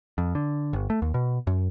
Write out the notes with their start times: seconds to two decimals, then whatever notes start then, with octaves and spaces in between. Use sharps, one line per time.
0.18 F2
0.35 D3
0.73 G1
0.90 A3
1.02 D#2
1.14 B2
1.47 F#2